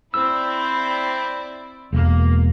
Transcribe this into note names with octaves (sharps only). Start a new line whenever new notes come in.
C4 E4 D5 E6
E1 A#3